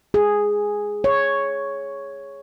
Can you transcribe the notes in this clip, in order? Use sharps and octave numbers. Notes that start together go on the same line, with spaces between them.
G#4
C#5